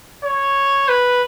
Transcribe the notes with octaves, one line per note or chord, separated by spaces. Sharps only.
C#5
B4